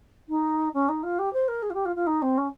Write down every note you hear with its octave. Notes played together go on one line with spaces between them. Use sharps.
D#4
C#4
D#4
F4
G4
C5
A#4
G#4
F4
G4
F4
F4
D#4
C4
C#4